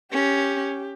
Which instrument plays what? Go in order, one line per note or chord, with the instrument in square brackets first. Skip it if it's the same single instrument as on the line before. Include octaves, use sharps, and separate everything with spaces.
[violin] C#4 [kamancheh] G4